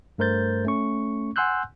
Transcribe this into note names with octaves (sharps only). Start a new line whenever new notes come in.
G2 A3 A#4 C5 G6 A6
A3 C#4 C#6
F#5 G#5 C6 E6 F#6 G6